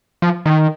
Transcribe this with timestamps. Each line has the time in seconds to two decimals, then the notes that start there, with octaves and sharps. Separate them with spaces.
0.22 F3
0.46 D#3